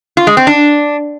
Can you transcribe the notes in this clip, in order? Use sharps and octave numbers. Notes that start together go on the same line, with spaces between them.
F4
G#3
C4
D4